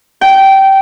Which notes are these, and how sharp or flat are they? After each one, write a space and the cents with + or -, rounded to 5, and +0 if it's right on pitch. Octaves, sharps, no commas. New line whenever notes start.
G5 -15